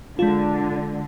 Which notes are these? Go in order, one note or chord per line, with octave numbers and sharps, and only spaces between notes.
D3 G#3 F4